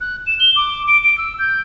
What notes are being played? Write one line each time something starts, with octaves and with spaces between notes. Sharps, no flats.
F#6
E7
G7
D6
D7
D7
E6
G6